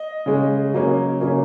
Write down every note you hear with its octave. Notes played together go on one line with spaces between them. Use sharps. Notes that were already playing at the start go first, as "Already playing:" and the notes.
Already playing: D#5
C#3 G#3 C#4
C#3 F#3 A#3 C#4
C#3 F#3 A#3 C#4